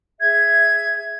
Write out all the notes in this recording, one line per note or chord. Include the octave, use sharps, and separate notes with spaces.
G#4 E5 G#6